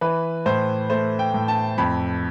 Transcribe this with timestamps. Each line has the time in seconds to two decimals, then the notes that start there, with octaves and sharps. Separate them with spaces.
0.01 E3 B4
0.46 A2 C5
0.90 A3 C5
1.19 G5
1.34 A2
1.48 A5
1.78 F2 B5